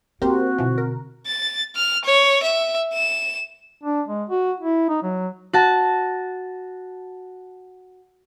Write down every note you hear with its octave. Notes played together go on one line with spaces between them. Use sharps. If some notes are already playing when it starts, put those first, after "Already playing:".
A#3 C4 F#4 G4 A#4 C5
B2 D3 E3 F3
A#4
A6
F6
C#5
E5
E7
D4
G#3
F#4
E4
D#4
F#3
F#4 A5